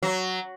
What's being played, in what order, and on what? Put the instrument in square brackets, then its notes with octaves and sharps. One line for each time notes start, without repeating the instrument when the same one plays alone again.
[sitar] F#3